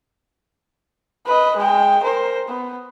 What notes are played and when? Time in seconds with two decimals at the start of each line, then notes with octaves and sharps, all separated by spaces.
1.26 B4 D#5
1.56 G#3 G5
2.03 A#4 C5
2.48 B3